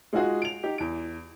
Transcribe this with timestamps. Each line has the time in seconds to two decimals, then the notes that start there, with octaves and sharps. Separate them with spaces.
0.13 G#3 D#4 F4 F#4 G#4
0.42 D7 F7
0.63 D#4 G4
0.78 E2 D7